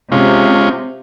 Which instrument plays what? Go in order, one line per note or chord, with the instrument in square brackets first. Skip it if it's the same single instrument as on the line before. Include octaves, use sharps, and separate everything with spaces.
[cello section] C3 [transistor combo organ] G#3 C#4 F4